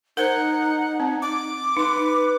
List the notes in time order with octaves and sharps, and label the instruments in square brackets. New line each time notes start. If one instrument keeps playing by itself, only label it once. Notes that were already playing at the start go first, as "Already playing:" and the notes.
[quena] D#4 [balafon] A#4 C5 [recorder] F#5
[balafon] C4
[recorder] D6
[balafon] D#4 C6 [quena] B4